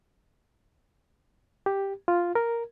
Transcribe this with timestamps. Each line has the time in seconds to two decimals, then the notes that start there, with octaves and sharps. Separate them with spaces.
1.66 G4
2.08 F4
2.35 A#4